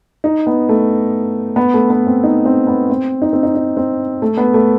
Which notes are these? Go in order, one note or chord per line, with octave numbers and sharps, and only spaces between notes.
D#4
B3
A3
B3
A3
B3
C4
D#4
C4
B3
C4
D#4
C4
D#4
D#4
C4
A3
B3
A3